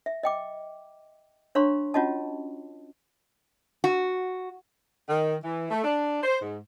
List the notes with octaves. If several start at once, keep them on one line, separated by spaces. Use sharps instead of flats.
E5
D#5 G5 D6
D4 C#5 F5 A#5 C6 C#6
C#4 F4 F#4 D#5 A5
F#4
D#3
E3
A3
D4
C5
G#2